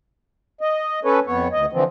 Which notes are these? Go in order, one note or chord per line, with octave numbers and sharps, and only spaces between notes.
D#5
C#4 A4 B4 C#5
F2 B3 C#5
D2 D#5
D3 E3 F3 C4